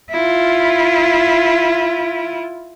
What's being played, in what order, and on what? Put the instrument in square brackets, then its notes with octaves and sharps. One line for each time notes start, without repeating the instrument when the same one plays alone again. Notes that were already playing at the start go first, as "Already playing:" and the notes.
[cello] E4 F4